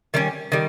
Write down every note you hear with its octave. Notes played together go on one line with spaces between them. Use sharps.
D#3 G3 C#4
D#3 G3